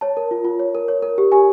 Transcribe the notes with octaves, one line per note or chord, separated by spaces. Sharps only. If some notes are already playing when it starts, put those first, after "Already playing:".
C#5 A5
A#4
F4
F4
C#5
A#4
C#5
A#4
G4
G4 G#5